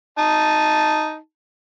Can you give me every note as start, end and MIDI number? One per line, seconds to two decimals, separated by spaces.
0.19 1.17 63
0.19 1.17 81